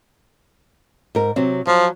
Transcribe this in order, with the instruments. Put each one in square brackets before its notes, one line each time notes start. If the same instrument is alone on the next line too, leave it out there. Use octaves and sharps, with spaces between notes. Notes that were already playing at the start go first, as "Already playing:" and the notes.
[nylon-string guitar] G#2 A#4
C3 F#3 C4
[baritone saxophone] F3 [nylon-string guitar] F#3